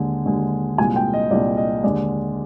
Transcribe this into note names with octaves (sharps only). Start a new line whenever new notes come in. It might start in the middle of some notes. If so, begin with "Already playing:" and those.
Already playing: D#2 D3 G#3
D#2 D3 G#3
C2 A#2 G#3 G#5
G5
D#5
C2 A#2 G#3 D5
D#5
D#2 D3 G#3 D5